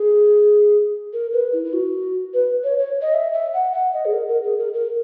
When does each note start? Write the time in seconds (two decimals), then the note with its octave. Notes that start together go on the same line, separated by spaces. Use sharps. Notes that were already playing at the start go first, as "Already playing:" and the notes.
Already playing: G#4
1.13 A#4
1.33 B4
1.53 E4
1.65 E4
1.73 F#4
2.34 B4
2.64 C#5
2.79 C#5
3.02 D#5
3.14 E5
3.33 E5
3.54 F#5
3.73 F#5
3.93 D#5
4.05 G#4
4.13 A#4
4.29 A#4
4.43 G#4
4.58 A#4
4.74 A#4